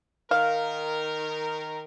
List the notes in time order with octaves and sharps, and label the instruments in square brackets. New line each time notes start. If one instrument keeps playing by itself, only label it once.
[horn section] D#3 A#4 [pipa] F5